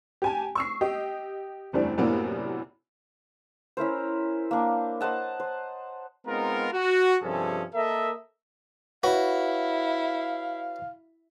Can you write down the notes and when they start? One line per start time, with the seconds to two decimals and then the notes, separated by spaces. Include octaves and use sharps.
0.22 G4 G#5 A5
0.55 C#6 E6 C7
0.81 G4 D#5
1.73 F#1 E2 G3 A3 C4 D4
1.98 F#2 A2 C3 A#3 B3 D4
3.77 C#4 E4 A#4 C5
4.51 A#3 D4
5.01 C5 D#5 F#5 A5
5.40 C5
6.27 G#3 B3 C4 D#4 F4 A#4
6.73 F#4
7.23 G2 C3 F3 C#4 G#4 A4
7.74 A#3 A4 A#4 D#5 E5
9.03 E4 F#4 B4 C#5 F5